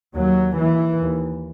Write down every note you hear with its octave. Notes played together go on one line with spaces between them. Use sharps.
D#2 F#3
D#2 E3
D#2